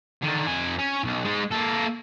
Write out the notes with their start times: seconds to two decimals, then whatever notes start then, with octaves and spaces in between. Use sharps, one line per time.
0.22 D3 D#3
0.47 F2 G#5
0.79 C#4
1.04 B1
1.24 G#3 D#4
1.51 A#3 A4